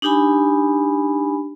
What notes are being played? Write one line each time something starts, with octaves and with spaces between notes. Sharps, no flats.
D4 D#4 G4 G#5 B5